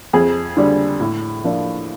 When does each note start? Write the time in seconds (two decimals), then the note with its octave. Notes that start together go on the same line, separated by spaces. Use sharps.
0.13 F2 G#4
0.57 D3 G3
1.00 A2
1.44 F3 A#3 D4